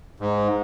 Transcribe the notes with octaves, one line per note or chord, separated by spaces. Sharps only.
G#2